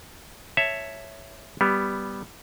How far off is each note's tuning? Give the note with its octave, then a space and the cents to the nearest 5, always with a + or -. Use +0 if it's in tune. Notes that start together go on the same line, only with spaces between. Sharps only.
C#5 +0 E5 +0 A5 +0
G3 +0 B3 +0